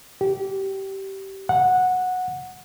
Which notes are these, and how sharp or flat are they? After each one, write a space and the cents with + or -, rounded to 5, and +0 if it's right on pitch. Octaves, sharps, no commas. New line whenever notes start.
G4 -20
F#5 -10